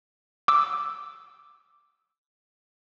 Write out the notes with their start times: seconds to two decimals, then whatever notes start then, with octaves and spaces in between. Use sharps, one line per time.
0.48 D6 E6